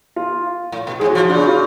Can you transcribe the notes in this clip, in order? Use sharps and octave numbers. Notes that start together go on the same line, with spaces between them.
F4
A2
B2
G#2 G#4
F#4
C#3 F3
F4
C#3 D4
F#4
F4